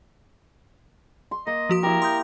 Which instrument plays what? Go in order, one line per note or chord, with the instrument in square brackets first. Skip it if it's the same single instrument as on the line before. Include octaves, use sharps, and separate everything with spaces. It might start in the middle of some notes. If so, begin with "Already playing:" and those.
[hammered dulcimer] C6
[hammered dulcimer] A#3 [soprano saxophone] D#5
[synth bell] F3 F#4 D#6
[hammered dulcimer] E4 G4 [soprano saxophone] A#4
[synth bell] C6 D#6 G6